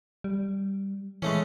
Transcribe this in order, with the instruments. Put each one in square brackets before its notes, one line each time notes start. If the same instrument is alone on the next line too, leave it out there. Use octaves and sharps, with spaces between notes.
[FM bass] G3
[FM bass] E3 [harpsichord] G#3 A3 C#4